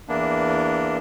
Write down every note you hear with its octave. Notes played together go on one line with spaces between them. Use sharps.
E2 E3 A#3 B3 D4